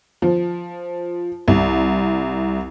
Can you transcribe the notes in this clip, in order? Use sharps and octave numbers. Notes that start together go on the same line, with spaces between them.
F3
C2